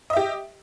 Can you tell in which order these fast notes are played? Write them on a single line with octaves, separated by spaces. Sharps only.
D#5 E5 G4